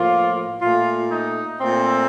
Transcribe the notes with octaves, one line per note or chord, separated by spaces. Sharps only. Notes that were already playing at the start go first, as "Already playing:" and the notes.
Already playing: A2 F3 A#3 F4
A#2 A3 F4
D#4
A#2 A3 C4